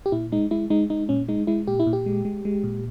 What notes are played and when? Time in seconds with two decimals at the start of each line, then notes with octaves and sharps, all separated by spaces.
0.06 G4
0.12 A#2 E4
0.32 G#3 D#4
0.51 G#3 E4
0.70 G#3 D#4
0.90 G#3 D#4
1.09 A#2 C#4
1.28 G#3 D#4
1.47 G#3 E4
1.67 A#2 G4
1.80 E4
1.87 A#2
1.93 G4
2.06 G#3
2.25 G#3
2.45 G#3
2.64 A#2